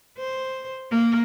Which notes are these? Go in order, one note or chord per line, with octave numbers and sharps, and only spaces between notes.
C5
A#3